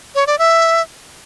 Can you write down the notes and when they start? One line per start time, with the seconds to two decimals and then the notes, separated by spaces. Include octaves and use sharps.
0.15 C#5
0.27 D5
0.39 E5